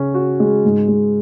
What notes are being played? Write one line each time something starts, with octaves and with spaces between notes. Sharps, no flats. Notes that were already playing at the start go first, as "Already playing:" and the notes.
Already playing: C#3 C#4
F#4
G#3
G#2
G#3